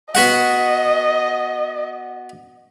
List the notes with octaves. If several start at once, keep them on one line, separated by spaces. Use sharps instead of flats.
B3 F#4 D#5 F#5